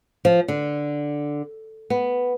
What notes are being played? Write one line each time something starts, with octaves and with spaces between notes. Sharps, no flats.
F3
D3
B3